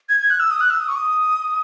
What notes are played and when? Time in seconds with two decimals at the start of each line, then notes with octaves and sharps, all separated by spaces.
0.09 G#6
0.20 G#6
0.30 F#6
0.40 E6
0.51 D#6
0.60 F#6
0.71 E6
0.80 D#6
0.88 C#6
0.96 D#6